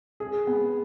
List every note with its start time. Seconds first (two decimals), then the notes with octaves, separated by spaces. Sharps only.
0.20 G#4
0.47 B3